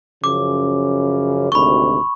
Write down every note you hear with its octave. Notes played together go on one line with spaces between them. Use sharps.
F#2 C#3 F3 D6
G#1 D2 C3 B5 C#6